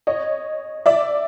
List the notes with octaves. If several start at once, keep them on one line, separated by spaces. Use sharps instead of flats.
C#5 D#5
D5 E5